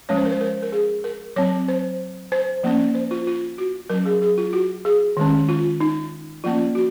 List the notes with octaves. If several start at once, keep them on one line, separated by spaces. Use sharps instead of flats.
F3 G#3 C#4 C#5
C5
A#4
C5
A#4
A#4
G#4
A#4
F#3 C4 C#5
C5
C5
F3 A#3 C#4
C5
F4
F4
F#4
F#3 C#4 A#4
G#4
G#4
F4
F#4
G#4
D#3 G#3 C#4
F4
D#4
F3 A#3 C#4 F4
F#4